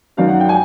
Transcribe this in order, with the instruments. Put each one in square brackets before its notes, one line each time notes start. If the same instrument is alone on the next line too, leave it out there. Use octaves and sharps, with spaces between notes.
[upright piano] F#2 D#3 F#3 F5
F#5
G5
G#5